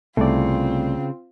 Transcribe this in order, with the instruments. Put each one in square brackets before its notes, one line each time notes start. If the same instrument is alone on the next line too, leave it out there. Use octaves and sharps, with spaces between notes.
[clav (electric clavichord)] C2 [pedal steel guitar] C#3 [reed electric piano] A3 D5 [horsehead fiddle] C4 F4